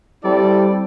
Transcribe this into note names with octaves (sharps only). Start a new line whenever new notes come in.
G3 C4 E4 A4 D5